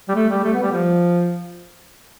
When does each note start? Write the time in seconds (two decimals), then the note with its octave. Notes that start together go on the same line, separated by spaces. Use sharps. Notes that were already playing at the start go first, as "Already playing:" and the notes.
0.08 G3
0.15 A3
0.29 G3
0.44 A3
0.53 B3
0.62 G3
0.72 F3